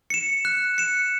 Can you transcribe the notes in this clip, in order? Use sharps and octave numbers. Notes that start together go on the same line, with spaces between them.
C#7 E7
F#6
C#7 E7